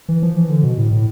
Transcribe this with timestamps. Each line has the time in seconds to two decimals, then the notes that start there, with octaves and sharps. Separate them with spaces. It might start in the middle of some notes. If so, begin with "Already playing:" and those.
0.09 E3
0.23 F3
0.37 E3
0.49 D3
0.63 B2
0.78 A2
0.91 A2